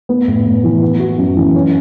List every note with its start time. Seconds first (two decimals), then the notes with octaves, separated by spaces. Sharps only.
0.09 B3
0.28 A2
0.45 A2
0.64 E3
0.82 B3
0.99 F#4
1.18 F#2
1.36 E3
1.55 C#4